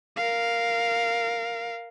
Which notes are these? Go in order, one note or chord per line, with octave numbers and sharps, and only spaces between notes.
A#4 F5